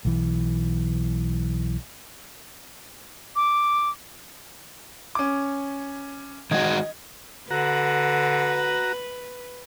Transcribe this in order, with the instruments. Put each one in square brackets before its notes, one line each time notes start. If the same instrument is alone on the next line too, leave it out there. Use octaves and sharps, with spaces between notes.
[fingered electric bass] B1 E3
[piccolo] D6
[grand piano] C#4 D6
[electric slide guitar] D#3 G#3 F#4 [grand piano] D#5 G#6
[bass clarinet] D3 [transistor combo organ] F#4 A#5 [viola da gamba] B4